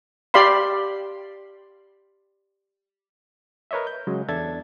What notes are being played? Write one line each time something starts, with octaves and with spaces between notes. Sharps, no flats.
G4 D5 F5 B5 C6
A#4 B4 C#5 D#5 E5
G6
C#3 F#3 G#3
E2 D4 A4 E5 G#6 A6